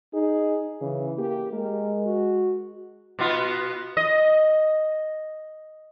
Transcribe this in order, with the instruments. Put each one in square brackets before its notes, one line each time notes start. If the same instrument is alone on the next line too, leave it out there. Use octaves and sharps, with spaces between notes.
[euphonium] D#4 [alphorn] G#4
[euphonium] C#3 [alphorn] E3
[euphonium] A#3 [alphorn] G4
[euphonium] G#3 [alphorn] A#4
[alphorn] F#4
[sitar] B2 B3 F4
D#5